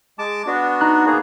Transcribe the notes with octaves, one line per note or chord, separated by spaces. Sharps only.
G#3 A5 D6
B3 D4 F#4
D#4 A#5 F#6
A#3 B3 G#4